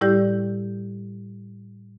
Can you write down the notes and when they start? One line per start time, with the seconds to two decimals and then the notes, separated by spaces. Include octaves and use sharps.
0.01 A2 G3 E4 G4 D5 G6